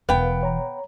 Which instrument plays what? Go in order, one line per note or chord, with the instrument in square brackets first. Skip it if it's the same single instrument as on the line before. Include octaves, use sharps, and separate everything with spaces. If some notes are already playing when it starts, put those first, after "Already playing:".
[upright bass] E1 E3 [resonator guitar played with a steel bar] B3 G5 [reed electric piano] A#4 B4 F5
[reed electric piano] C#5 A#5